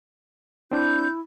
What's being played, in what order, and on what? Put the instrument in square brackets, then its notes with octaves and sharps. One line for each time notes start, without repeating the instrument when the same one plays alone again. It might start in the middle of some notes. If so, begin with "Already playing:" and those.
[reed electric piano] C4 D4 [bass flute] E4 [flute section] G6